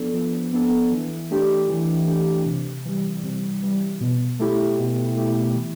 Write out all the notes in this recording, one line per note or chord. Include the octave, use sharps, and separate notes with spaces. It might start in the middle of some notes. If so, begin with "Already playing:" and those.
Already playing: F3 B3 D4 A4
F3
B3 D4 A4
E3
A3 D4 G4
E3
A3 D4 G4
C3
E3 G3
C3
E3 G3
B2
A3 E4 G4
B2
A3 E4 G4
E3